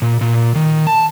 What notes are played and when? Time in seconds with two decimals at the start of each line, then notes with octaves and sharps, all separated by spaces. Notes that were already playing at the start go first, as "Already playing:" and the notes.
0.02 A#2
0.21 A#2
0.55 D#3
0.87 A5